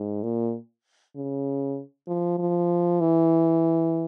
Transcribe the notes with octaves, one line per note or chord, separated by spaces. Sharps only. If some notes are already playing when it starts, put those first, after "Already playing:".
Already playing: G#2
A#2
C#3
F3
F3
E3